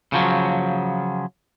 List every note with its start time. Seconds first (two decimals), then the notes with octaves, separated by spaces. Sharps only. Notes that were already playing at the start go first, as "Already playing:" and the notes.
0.12 C#3 F3 F#3